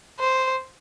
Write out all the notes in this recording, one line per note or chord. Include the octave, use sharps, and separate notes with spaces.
C5